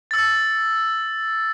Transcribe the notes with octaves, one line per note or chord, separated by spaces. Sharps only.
E6 A6